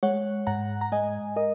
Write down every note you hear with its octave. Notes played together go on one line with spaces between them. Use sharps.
G#3 C#5 F#5
G#2 F#5 A#5
A#5
G#3 D#5 G#5
A#4 D#5